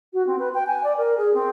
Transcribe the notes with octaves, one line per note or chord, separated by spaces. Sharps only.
F#4
C4
B4
G5
G#5
D5
A#4
G#4
C4